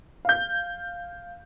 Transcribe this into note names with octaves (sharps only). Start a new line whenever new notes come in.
F5 G6